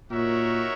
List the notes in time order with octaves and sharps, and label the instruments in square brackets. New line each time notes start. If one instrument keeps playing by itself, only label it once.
[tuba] A#2 [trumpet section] D#4 F#4 A#4 C#5 E5